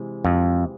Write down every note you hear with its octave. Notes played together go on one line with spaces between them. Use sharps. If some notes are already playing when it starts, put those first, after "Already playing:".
Already playing: C3 E3 G#3
F2